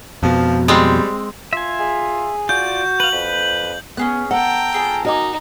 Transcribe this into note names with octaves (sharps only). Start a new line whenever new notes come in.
F2 B2 F3
G3 G#3 C4
F4 E5 G#5
G#4
F4 F#4 D5 G6
B4 F5 F#7
F2 B4
B3 C#4 G#4 F#6
A4 F#5 G5 A#5
F4 G#4 A4
D#4 F#4 A#4 D#5 G#5 D6